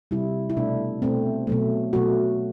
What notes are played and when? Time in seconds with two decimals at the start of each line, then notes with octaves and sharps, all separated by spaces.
0.11 C3 G3 E4
0.50 E4
0.57 B2 A3 D4
1.02 B2 A3 C4
1.47 B2 F#3 A3
1.93 B2 F#3 A3 F#4